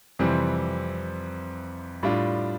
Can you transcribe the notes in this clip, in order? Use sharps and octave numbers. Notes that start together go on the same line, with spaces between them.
F2 C3 E3 G3 C4
A2 G3 D4 F4